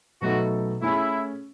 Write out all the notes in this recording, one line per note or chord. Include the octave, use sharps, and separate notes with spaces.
B2 F#3 A3 D#4 F#4 A4
A3 C#4 E4 G#4